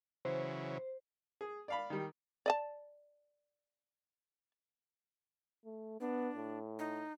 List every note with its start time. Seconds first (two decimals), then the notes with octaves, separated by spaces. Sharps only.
0.25 C#3 E3 F#3 C5
1.41 G#4
1.68 D5 F5 B5
1.90 D#3 G3
2.46 D5 D#5 A5
5.65 A3
6.00 B3 D4
6.36 A2
6.79 D#4